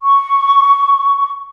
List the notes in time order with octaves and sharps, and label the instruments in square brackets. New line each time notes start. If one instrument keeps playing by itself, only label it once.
[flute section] C#6